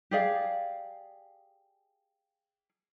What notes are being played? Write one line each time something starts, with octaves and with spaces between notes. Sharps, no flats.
G4 G#4 D5 F5